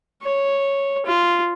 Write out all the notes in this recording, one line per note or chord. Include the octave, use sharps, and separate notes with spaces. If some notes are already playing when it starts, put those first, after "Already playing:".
C#5
F4